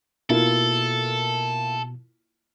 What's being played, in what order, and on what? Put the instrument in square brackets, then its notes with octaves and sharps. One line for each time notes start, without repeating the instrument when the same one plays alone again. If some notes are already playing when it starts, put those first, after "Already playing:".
[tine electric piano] B2 [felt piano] A#3 E4 F4 [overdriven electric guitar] A4